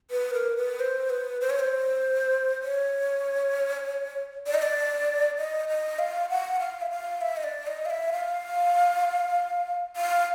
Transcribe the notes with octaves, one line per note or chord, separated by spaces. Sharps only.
B4
A#4
B4
C5
B4
C5
C#5
C5
C#5
D5
D#5
D5
D#5
D#5
F5
F#5
F5
E5
F5
E5
D#5
D5
D#5
F5
E5
F5
F5